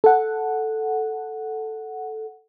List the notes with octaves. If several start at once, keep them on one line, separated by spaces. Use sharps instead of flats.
A4 F#5